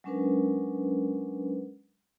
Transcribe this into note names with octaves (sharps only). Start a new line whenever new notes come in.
F#3 G#3 C#4 D4 A#4 B4